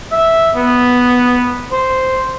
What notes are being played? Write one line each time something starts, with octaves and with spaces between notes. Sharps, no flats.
E5
B3
C5